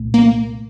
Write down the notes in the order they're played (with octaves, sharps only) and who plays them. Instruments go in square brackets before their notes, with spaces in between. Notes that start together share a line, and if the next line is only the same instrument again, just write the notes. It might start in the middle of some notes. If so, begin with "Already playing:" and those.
Already playing: [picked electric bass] C2 A#2 A3
[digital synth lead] A#3